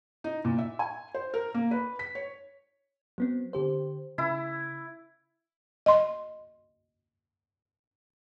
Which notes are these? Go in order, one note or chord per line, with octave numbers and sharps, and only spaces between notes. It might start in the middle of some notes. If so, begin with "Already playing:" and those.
D#4
A#2
E5
G#5
C5
A#4
A#3
B4
B6
C#5
F#3 B3 C4
D3 G4 C5
C#3 E4
D#5 C6